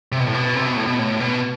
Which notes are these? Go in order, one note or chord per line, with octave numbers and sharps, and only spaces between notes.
C3
B2
A2
B2
C3
B2
A2
B2
A2
B2